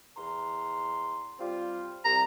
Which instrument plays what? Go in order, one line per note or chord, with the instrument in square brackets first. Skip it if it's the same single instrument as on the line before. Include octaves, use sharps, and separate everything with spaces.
[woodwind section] E2 A#5 C6
G3 C4 F4
[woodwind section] C2 [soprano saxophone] A#5